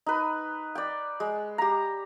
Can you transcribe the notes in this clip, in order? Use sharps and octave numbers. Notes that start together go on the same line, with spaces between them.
D#4 B4
D5 G5
G#3
G4 A#5